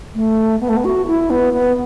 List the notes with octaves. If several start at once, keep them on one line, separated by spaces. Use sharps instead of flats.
A3
B3
A3
B3
F#4
E4
B3
B3